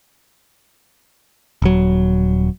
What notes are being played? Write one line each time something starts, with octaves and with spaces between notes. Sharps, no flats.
D#1 F#3